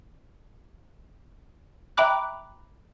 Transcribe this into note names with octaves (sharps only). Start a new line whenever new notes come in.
E5 G5 A#5 B5 D6 F#6